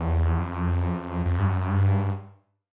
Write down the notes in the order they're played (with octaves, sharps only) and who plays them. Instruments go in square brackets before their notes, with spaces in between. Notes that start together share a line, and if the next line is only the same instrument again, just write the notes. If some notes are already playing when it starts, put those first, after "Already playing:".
Already playing: [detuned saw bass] E2
F2
F2
G2
F#2
G2